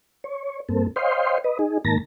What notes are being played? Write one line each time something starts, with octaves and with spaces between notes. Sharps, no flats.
C#5
G2 A#3 C4 A4
C5 C#5 D#5 F5 G5 C6
B4 D#5
D#4 G#4
G#2 D#3 A#3 A5 A#5 A#6